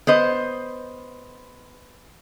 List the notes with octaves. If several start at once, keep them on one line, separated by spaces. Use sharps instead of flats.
B3 C5 D#5